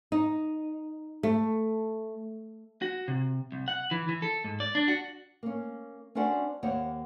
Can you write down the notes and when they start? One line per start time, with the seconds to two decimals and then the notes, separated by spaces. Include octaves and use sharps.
0.12 D#4
1.23 A3
2.82 F#4
3.08 C3
3.52 C2
3.68 F#5
3.91 E3
4.09 E3
4.22 A4
4.44 G#2
4.60 D5
4.75 D4
4.88 F#4
5.43 A#3 C#4
6.15 C#4 D4 F#4 C5 D5 F#5
6.63 D#2 A#3 C5 C#5 F#5